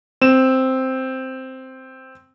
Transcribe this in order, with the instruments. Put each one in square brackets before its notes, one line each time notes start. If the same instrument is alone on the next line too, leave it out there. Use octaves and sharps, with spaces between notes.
[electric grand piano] C4 E7